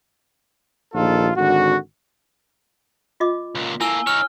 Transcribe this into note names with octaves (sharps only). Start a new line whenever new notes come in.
A#1 D#2 D#4 F4 A4
G#1 D3 F#4
F4 D#5 D6
C#2 A#2
A#3 E4 A4 G#5 E6 G7
D#4 C#5 F6